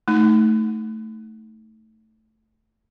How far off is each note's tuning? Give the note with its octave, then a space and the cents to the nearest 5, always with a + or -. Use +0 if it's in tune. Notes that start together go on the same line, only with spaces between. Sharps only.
A3 +0 D#4 +15